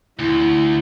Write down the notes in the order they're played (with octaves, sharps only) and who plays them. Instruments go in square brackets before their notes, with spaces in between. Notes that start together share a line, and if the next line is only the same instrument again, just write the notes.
[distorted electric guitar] D2 [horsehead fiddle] E4